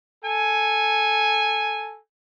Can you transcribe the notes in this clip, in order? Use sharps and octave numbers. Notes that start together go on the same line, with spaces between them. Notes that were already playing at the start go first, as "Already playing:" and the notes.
A4 G#5